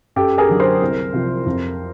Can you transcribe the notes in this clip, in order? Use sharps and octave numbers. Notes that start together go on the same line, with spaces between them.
F#2 G4 A4
G#4 A#4
D3 F#3
A#4 C5
C2
C3 F3
F2